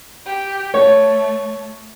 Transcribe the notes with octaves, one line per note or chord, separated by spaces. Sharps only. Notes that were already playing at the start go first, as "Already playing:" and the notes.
G4
A3 C#5